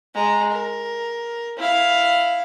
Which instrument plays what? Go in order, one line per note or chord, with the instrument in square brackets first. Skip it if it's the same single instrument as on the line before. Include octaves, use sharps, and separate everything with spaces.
[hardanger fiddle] G#3 A#5
A#4
E4 F5